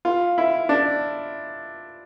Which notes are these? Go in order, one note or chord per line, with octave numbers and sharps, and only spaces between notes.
F4
E4
D4